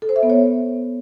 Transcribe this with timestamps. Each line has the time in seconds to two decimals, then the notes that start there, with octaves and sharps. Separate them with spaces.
0.02 A4
0.09 C5
0.16 E5
0.23 B3
0.30 C#5